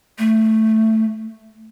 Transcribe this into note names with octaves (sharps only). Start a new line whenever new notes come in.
A3